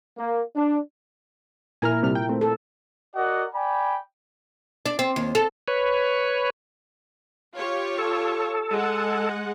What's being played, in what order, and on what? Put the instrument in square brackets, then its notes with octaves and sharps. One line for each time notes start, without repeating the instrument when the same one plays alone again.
[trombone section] A#3
D4
[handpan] A#2 E4 A#4 [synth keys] G#5 A#5 F6
[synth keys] C3 G3 F6
G5
A3 C4
[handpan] A4
[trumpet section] F#4 A#4 D5 D#5 F#5
D5 G5 G#5 B5
[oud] D4
C4
D#2
A4
[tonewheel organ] B4 C#5
[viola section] F4 G4 C#5
[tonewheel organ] A4
[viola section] G#3 F#5